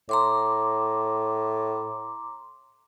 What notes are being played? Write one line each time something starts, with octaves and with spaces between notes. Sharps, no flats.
A2 A#5 C6 D6